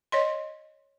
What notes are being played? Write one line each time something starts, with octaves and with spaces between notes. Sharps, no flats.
C#5 D#5 C6